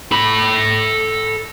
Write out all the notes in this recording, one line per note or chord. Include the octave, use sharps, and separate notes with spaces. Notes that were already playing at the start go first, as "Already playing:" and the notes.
A4 B5